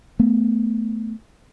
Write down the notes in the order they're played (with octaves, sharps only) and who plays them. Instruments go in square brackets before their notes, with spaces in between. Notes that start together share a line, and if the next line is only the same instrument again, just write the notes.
[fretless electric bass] A3 B3